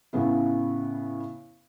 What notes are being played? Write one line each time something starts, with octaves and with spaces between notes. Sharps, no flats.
A2 C#3 B3 E4